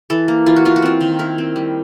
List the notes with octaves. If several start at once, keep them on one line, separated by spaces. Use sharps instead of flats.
E3 A4
A#3
E3 F4
F#4
E3 F4
F#4
C4 F4
D#3
E4 A#4
C4
G3